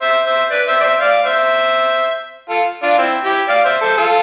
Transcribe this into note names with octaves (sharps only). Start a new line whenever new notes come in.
C5 E5
C5 E5
B4 D5
C5 E5
D5
C5 E5
D5 F5
C5 E5
F4 A4
D4 F4
C4 E4
E4 G4
D5 F5
C5 E5
A4 C5
F4 A4